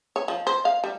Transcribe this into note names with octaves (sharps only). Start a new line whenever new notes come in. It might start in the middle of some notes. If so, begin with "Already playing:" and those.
C#5
F3
C5
F5
G3